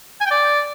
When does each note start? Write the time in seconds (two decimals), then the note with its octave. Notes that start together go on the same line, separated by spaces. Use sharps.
0.20 G#5
0.26 G5
0.31 D5